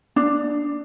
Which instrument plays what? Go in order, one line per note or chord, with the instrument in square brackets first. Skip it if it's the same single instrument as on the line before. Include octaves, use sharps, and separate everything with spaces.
[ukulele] D4